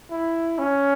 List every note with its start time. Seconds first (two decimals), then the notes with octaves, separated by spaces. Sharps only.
0.11 E4
0.59 C#4